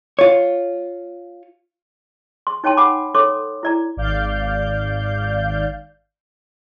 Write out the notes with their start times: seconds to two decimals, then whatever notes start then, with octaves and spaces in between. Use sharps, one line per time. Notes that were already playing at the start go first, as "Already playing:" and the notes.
0.19 F4 C#5
2.47 C6
2.64 D#4 C#5 G5 A5 C6
2.77 F#5 G#5 B5 D6
3.14 A4 C#5 C6 D6
3.63 E4 D5 A#5
3.97 G#1 D5 F5 G6